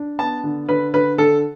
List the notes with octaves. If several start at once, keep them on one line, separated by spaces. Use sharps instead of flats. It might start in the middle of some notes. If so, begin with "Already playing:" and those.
Already playing: D4
B3 A5
D3
D3 B4
D3 B4
D3 A4